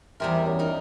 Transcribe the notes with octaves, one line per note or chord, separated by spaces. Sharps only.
E2 C3 G3 A#4
F#2
D#4 A#4